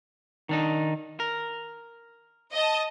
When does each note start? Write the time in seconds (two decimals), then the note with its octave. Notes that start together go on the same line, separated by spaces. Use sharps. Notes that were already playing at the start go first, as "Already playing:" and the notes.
0.49 D#3 D4 D#4
1.20 A#4
2.54 D#5 A5